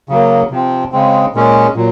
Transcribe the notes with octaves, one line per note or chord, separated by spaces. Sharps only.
C#3 F#3 A#3
C3 F3 C4
C#3 G#3 C4
A#2 G#3 C#4
A#2 F#3